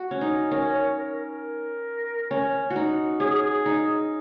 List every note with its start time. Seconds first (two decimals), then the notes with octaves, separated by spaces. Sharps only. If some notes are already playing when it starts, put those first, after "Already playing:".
Already playing: F#4
0.11 C#4
0.21 D#4
0.51 C#4 A#4
0.74 C#5
0.96 A#4
1.19 A#4
2.31 C#4
2.70 F#4
2.76 D#4
3.20 C#4 G#4
3.66 D#4